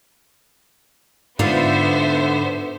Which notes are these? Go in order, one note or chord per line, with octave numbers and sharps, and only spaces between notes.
G#2 D3 B3 F4 C5 E5